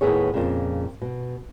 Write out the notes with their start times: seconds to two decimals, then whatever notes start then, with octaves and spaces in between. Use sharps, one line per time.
0.01 D#2 A2 B3 G#4 C#5
0.34 F2 A#2 C#3
1.02 B2